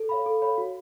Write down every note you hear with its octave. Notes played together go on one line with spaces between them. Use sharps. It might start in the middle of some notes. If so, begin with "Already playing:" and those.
Already playing: A4
C#5 F5 B5
A4
C#5 F5 B5
F#4